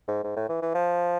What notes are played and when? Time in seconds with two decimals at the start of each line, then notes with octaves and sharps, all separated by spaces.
0.08 G#2
0.24 G#2
0.37 A2
0.49 E3
0.62 E3
0.75 F3